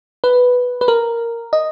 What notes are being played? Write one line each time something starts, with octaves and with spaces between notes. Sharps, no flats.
B4
B4
A#4
D#5